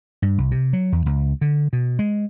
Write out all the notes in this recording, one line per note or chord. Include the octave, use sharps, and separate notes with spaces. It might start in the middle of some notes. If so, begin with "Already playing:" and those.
G2
C2
C3
F#3
E2
C#2
D3
B2
G#3